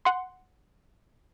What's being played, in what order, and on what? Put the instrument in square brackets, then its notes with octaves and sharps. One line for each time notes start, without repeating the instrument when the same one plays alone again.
[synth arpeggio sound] F#5 C6